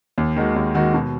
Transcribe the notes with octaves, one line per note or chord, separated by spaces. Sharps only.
D#2
D#3 G#3 D#4 F#4
D#2
D#3 G#3 D#4 F#4
B2